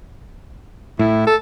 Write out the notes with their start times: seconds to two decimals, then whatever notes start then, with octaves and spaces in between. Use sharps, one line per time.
0.99 A2 E4
1.27 A4